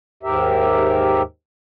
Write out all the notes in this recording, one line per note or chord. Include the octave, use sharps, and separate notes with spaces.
D#2 G#2 G4 A#4 E5